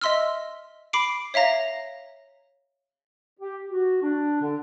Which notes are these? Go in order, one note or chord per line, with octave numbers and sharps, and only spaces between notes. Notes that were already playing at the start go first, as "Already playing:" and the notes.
D#5 E5 C6 E6 F6
B5 D6 C7 D7
C#5 E5 F5 A#5 A#6
G4
F#4
D4
D3